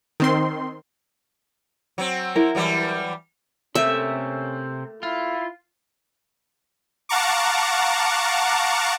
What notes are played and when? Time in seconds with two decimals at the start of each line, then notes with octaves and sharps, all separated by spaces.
0.20 D#3 C4 C6
1.98 F#3 C4
2.36 E4 A#4
2.55 E3 F#3 G3
3.75 C3 A3 A#3 C4 C#4 E5
5.03 E4 F4
7.09 F5 F#5 A5 A#5 C#6 D6